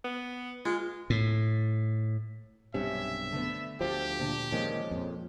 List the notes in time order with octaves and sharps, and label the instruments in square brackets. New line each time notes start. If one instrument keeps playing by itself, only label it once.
[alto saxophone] B3
[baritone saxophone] G#3 [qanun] F4
[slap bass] A2
[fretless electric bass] B1 G2 C3 [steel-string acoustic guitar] C#4 [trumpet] E5
[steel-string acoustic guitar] D3 A3 B3
[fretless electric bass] D2 F3 [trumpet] G4 [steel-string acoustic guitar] C5
[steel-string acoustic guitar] A#2 D3
[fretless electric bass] A#2 D#3 [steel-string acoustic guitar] F3 G#3 C#4
[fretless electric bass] F2 A#2